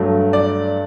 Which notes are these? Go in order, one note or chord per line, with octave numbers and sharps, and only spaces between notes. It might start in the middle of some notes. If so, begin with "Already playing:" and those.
Already playing: G2 F#3 A3
D5